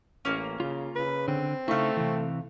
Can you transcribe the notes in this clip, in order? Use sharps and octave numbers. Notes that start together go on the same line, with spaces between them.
A1 A#3 C#4
C#3 F4
C#3 B4
D3 C4
C#3 A3 D#4 E4 F5 C#6
C3 E3